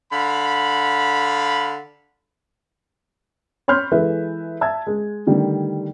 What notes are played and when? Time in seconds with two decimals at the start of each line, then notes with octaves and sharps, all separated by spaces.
0.12 D3 F5 B5
3.68 C#5 B5 C6 F6 G6
3.91 E3 G#3 A4 B4 E5
4.61 E5 A5 E6 G#6
4.87 G#3
5.27 D3 D#3 G3 A3